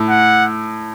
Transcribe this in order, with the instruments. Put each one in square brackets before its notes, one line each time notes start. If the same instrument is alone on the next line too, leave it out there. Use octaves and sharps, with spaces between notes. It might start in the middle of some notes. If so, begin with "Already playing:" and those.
Already playing: [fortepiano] A2
[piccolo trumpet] F#5